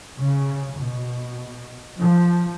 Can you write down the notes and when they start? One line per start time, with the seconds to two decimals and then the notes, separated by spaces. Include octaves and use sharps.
0.20 C#3
0.79 B2
1.98 F3